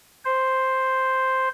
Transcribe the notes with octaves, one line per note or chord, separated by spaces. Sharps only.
C5